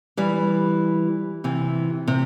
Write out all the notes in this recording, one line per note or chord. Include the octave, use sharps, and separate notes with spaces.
E3 G3
C3 E3
C3